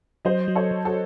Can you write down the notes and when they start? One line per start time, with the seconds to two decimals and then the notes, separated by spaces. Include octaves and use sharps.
0.25 F#3 C5 D#5
0.48 F#3
0.55 A4 C#5
0.71 F#3
0.85 F#4 A4